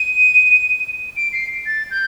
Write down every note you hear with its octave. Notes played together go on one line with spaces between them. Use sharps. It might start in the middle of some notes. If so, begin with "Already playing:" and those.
Already playing: D#7
D7
C7
A6
G6